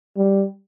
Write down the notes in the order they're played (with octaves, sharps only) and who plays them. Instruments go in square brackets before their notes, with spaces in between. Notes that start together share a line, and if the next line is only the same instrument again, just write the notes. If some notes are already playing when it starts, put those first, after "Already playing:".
[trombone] G3